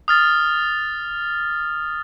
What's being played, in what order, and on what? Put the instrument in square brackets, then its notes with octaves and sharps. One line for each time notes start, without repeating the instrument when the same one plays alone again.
[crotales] D#6 F6 A6